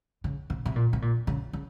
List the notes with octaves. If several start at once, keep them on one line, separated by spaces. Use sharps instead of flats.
C#3
C3
C3
A#2
C3
A#2
C#3
C#3